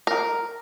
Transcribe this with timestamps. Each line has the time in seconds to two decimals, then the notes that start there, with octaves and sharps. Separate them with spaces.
0.07 A#4